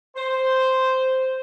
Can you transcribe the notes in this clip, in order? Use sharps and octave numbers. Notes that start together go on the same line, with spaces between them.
C5